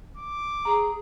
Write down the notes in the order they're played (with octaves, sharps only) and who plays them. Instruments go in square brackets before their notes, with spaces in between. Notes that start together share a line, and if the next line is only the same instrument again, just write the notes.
[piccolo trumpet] D6
[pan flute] G#4 [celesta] A#5